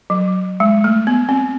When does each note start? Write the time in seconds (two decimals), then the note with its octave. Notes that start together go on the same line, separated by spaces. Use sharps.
0.10 F#3
0.60 G#3
0.84 A3
1.07 B3
1.29 C4